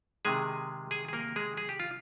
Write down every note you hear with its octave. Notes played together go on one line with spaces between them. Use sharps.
C3 D#3 G#3 G#4 G#5
G#4 G#5
G#4
A#3 A#4
G#3 G#4
G#4
G4
F4